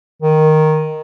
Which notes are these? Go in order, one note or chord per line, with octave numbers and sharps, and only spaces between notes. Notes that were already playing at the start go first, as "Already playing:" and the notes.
D#3